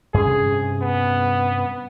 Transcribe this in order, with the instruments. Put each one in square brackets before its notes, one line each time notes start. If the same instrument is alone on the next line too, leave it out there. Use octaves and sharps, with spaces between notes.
[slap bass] G2 C3 C#4 [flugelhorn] G#4
[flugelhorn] B3